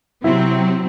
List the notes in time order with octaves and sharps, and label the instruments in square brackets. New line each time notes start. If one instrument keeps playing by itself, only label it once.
[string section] C3 F#3 C4 [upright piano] E4